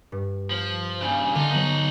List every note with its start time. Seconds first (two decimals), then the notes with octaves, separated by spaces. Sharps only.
0.12 G2
0.50 F3
1.01 G2 C#3 G#5 G6
1.35 D3 D#4 F4
1.50 F#3 B3 D#4 F#4